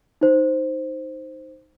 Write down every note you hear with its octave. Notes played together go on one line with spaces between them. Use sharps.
D#4 C5